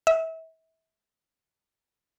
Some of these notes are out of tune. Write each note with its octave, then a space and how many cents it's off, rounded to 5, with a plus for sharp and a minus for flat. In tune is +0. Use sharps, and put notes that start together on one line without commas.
E5 -35